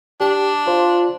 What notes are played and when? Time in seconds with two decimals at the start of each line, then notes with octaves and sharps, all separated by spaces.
0.21 D4 G4
0.68 F4 C5